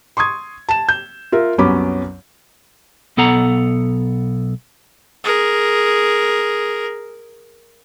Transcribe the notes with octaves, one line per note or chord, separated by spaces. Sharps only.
C6 C#6 D#6 G#6
A5 E7
G6
F4 A#4 E5
C2 F#2 B3 C#4 B5 D6
B1 B3 A4 F#5 A#5
G#4 A#4